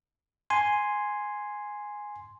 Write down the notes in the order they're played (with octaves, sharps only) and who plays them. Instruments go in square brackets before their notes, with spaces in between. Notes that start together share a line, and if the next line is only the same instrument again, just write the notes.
[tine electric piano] G#5 C6